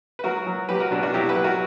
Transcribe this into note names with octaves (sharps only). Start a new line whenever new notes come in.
B4
F#3 F#4 A#4
F#3
F#3 G4 B4
F#4 A#4
B2 D4
D4 F#4
F#3 E4 G4
G4 B4
F#3
F#4 A#4